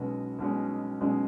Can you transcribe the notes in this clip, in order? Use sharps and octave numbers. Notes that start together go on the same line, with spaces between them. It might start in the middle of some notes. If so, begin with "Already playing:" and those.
Already playing: B1 B2 G#3 C#4 F#4 B4
B1 B2 G#3 C#4
B1 B2 G#3 C#4